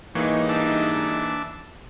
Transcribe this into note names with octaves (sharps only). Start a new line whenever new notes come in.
G#2 E3 G3 A#3 D#4 C#5
D4 E5 A5